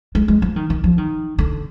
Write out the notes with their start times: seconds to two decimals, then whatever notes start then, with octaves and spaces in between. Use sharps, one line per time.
0.15 G#3
0.28 G#3
0.42 F3
0.56 D#3
0.70 D#3
0.84 F3
0.98 D#3
1.39 D3